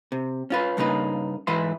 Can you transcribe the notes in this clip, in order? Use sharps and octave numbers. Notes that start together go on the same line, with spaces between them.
C3
C#4 F4 B4
G2 C#3 A#3 D#4 B4
G#2 E3 E4 B4 C6